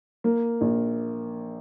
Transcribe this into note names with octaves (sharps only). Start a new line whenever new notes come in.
A#3
A#1